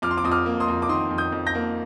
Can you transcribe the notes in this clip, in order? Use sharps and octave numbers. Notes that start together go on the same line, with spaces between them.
F2 D6 F6
C6
D6
F2 D#6
D6 F6
A#3
C6 D#6
F2
D6
D#3 C6 D#6
F2
D#6 G6
F2
G6 A#6
A#3